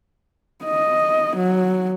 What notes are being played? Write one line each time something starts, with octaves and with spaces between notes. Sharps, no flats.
D#5
F#3